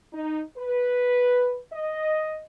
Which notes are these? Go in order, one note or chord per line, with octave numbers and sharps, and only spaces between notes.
D#4
B4
D#5